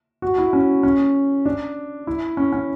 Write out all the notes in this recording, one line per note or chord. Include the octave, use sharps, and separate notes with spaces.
F#4
E4
C#4
C#4
D4
E4
C#4
C#4